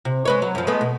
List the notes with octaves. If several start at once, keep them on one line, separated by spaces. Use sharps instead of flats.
C3
G#3 B4 C#5
F#3
F#2 F3
G#3 A3 B3
B2